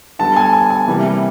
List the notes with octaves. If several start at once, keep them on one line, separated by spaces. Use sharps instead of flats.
D3 G3 B3 A5
G#5
G#5
G#5
C3 E3 G3 A#3